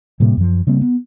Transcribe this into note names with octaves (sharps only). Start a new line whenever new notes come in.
A2 C3 G3 A#3
F#2 F3
C#3 G3 A#3 C4
B3